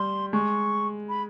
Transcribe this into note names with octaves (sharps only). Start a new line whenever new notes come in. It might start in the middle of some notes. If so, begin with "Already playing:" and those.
Already playing: G3 C6
G#3 C#6
B5